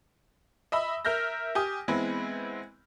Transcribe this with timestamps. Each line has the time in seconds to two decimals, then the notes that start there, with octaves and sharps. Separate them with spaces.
0.72 D#5 E5 B5 E6
1.05 A#4 E5 F6 G6 A#6
1.55 G4 G#5 D#6
1.88 E3 G#3 B3 C4 E4